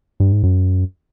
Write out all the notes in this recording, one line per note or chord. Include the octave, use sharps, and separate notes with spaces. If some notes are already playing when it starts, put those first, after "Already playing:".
G2
G#2
F#2